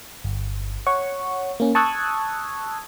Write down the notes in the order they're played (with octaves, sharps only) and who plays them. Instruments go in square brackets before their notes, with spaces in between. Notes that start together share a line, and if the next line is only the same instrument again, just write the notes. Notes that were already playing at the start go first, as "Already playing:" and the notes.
[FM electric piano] G1
C#5 F#5 C#6
A#3 C#4
A5 C#6 D#6 E6 F#6 G#6